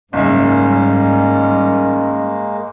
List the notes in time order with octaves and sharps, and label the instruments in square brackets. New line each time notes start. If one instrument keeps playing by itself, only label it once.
[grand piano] F#1 E5 [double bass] G#2 [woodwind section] D#3 G3 C#4 [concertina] G#3 A#3